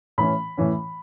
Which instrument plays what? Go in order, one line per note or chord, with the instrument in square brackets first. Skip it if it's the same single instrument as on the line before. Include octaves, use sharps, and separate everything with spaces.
[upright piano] A2 E3 C#4 B5
A2 E3 C#4